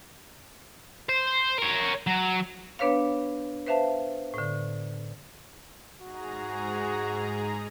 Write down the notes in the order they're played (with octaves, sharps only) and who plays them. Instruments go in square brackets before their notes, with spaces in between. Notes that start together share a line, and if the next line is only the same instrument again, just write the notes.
[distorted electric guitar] C5
A#4 C#5
F#3
[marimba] B3 D4 B4 C#5 F5
B4 C5 E5 F5 A5
A2 D3
[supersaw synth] G#2 G#4 A#5 [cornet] F#4